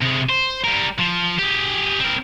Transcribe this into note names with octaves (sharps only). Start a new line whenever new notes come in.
C3 G#3
C5
G3 A#4
F3
G4 G#4
C4 A#4